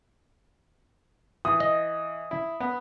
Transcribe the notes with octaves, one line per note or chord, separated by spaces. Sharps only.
E3 D#6
D#5
E4
B3